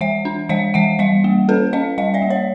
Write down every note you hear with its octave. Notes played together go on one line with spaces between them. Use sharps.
E3 E5 F#5
D4
E3 D#5 F5
E3 E5 F#5
G3 D#5 F5
A#3
C#4 A4 B4
C#4 D#5 F5
G3 D#5 F5
D5 E5
A#3
C#5 D#5